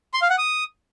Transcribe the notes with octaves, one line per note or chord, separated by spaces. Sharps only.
C6
F5
F#5
D#6